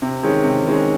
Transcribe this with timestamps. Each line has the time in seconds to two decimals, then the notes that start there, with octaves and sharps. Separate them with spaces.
0.02 C3
0.23 D#3 G#3 C#4
0.44 C3
0.64 D#3 G#3 C#4